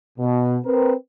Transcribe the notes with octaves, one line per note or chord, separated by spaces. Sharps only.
B2
C4 A#4 B4